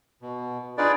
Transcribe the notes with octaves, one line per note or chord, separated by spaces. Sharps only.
B2
D4 D#4 F4 G#4 B4 D5